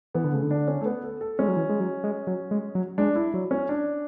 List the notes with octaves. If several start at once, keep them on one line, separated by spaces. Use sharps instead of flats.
E3 B3
D3
C#3 A3
D3
D4
C#4
A3
B3
A4
A4
G#3 C#4
F#3
E3
G#3
F#3
G#3
F#3
G#3
F#3
G#3 D4
E4
F#3
C#4
D4